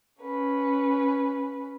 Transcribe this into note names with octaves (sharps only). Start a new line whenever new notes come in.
C#4 B4